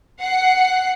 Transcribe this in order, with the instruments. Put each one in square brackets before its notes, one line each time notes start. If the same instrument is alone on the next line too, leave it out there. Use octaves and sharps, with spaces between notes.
[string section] F#5 C7